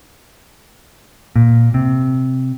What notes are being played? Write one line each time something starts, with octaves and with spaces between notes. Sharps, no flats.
A#2
C3